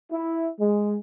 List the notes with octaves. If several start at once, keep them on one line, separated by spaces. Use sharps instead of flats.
E4
G#3